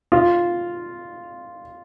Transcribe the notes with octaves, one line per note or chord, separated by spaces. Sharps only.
F4